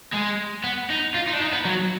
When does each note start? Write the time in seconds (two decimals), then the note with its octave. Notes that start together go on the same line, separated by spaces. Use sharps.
0.13 G#3
0.64 B3
0.90 D#4
1.15 F4
1.28 D#4
1.34 D4
1.40 D#4
1.53 B3
1.65 F#3